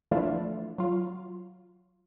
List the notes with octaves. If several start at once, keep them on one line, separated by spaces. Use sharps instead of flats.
E3 F3 A3 D4 E4 F4
F#3 F4